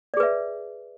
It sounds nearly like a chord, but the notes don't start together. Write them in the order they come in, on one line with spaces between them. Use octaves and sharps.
D5 G#4 B4 E5